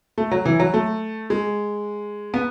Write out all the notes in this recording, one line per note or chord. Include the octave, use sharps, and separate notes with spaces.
A3
F#3
E3
F#3
A3
G#3
B3